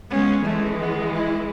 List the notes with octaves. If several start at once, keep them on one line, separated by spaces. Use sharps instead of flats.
G#3 B3 C#4
E3 G#3 A3
B3
E4